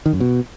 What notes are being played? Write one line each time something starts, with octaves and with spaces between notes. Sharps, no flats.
D#3
F#2
B2